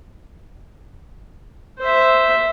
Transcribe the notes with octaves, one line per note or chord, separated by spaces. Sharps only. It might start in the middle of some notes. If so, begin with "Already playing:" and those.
C5 E5